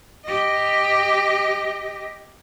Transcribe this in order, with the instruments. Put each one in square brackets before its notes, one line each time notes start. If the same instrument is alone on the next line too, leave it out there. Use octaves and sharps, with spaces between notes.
[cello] G4 D#5